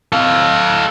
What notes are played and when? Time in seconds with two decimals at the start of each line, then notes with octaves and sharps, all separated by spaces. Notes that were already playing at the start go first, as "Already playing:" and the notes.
0.12 A4 F5